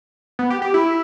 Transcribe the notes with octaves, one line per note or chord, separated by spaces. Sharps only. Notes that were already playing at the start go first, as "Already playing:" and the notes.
B3
G4
G4
E4